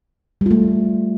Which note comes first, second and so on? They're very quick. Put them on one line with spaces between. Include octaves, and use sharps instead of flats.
G3 F4 A3